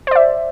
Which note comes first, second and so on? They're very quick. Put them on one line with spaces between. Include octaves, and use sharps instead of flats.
C5 D5 E5